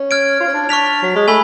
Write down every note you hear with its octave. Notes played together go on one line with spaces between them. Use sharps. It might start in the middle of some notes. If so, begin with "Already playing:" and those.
Already playing: C#4
F6 G#6 D7
F4
C#4
D4
D4 C#6 F6 B6 F7
F#3
G#3
A3 G#5 B5